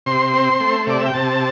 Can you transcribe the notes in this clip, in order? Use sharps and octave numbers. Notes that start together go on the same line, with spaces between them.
C3 C6
C4
A3
C3 D5
E5
G5
C3 A5